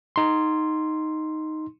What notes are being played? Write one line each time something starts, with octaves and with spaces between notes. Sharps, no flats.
D#4 C6